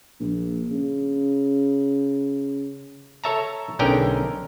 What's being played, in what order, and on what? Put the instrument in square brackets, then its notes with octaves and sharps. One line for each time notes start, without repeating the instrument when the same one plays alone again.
[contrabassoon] A#1
C#3
[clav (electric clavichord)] A4 C#5 E5 A5 A#5
B1 D3 C#4 G#4 A#4 G5